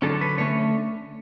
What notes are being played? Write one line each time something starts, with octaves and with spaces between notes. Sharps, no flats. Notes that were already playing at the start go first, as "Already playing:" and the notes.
D3 F#3 C#4 A4
B4
D3 A3 C#4 C#5